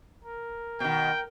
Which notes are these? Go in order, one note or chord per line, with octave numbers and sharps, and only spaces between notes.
A#4
B2 D#3 G5